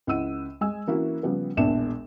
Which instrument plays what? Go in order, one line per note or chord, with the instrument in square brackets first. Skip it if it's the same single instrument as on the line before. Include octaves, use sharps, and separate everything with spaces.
[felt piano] C#2 E4 F#5 E6 D#7
G#3 G#5 E6
E3 A#3 C#4 E4 F#4
C#3 F3 G3 B3
E1 A#1 E2 D4 E7